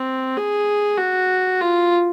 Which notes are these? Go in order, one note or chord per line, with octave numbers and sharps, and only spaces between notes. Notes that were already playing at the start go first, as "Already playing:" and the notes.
Already playing: C4
G#4
F#4
F4